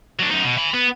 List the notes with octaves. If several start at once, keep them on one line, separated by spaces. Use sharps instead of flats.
F#3 D4
F#2 D#4
B2
G#5 B5
B3